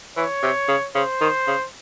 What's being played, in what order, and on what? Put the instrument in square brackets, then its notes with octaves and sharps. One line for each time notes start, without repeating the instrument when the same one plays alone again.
[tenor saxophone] E3 [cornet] C#5
[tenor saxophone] C3
C#3
[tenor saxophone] C#3 [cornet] C5
[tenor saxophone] D#3
C#3